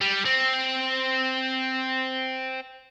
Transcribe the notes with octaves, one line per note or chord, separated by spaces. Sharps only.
G3
C4